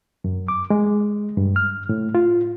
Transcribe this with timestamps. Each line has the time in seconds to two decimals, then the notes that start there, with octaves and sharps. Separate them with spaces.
0.24 F#2
0.48 D6
0.70 G#3
1.37 G2
1.56 F6
1.89 A2
2.15 F4